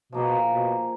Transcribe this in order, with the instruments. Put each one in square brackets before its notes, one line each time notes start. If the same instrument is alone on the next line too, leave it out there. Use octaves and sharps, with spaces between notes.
[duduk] B2 [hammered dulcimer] F3 A#3 D#4 G#4
[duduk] B2